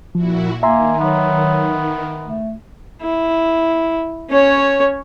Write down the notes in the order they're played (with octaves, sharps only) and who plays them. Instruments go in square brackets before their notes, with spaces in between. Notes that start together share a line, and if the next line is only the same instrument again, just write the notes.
[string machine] A#2 E4 F#4 [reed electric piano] F3
[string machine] D#3 [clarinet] A#3 [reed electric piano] E5 A#5 C6 [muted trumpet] G#5
[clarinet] F#3 [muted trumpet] B3
[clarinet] A3
[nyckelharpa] E4
C#4 C#5